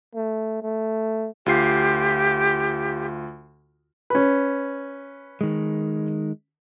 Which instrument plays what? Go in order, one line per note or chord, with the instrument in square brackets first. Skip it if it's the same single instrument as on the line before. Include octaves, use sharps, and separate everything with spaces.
[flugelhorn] A3
A3
[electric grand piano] D2 F4 C7 [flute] G4
[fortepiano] C#4 B4
[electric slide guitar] D#3 G#3